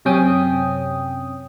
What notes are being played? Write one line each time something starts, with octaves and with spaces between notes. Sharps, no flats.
F#2 C3 C#4 G5 D#6